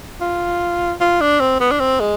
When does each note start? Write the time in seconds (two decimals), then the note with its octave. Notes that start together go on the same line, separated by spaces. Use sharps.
0.21 F4
1.01 F4
1.21 D4
1.40 C4
1.60 B3
1.71 D4
1.80 C4
2.00 G#3